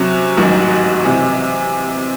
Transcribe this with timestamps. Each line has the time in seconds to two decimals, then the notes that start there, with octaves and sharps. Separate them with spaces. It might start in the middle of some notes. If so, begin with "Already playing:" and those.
Already playing: C3 F#3 C#4
0.37 A1 G#2 D#3 F#3
1.04 C3 E3